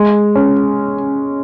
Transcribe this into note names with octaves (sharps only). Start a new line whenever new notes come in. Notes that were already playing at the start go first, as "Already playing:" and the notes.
Already playing: G#3
C#4